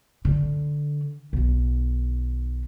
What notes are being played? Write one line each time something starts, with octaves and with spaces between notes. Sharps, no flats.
D3
B1 D#3